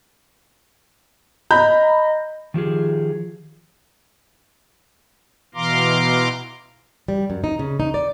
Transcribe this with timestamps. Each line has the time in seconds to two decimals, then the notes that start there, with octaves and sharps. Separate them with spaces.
1.51 D#5 A#5 B5 G6
2.54 D#3 F3 G4 G#4
5.55 B2 E3 F5 A#5 C6 D6
7.08 G3
7.30 F#2
7.44 D#4
7.59 C#3
7.80 D#4
7.94 D5